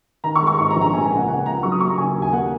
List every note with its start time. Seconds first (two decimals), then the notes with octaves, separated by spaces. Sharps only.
0.24 D#3 A#5
0.36 C#6
0.42 G#3
0.47 C#6
0.59 G#2 C#6
0.70 A#5
0.76 A#1
0.81 A#5
0.93 A#3 G#5
1.05 G#5
1.11 C#2
1.17 F#5
1.28 C#3 F#5
1.46 C#2 A#5
1.63 F#3 C#6
1.72 D#6
1.80 A#3 C#6
1.89 A#5
1.98 C#3 G#5
2.16 D#2
2.22 G#5
2.33 A#3 F#5